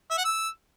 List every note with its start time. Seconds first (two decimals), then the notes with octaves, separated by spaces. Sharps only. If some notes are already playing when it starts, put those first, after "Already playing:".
0.11 E5
0.18 F#5
0.25 E6